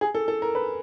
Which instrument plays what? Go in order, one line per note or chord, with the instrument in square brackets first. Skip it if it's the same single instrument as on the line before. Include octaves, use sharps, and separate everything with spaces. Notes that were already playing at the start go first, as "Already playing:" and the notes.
[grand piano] G#4
A4
A4
A#4
B4